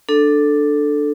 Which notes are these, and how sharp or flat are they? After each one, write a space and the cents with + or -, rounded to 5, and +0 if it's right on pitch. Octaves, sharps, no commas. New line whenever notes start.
D4 +10 A4 +0